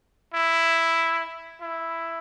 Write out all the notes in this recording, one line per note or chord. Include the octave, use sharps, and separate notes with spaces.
E4
E4